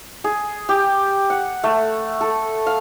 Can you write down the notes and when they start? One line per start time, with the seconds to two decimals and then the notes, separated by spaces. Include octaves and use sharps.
0.24 G#4
0.69 G4
1.30 F#5
1.64 A3
2.21 A4
2.67 F5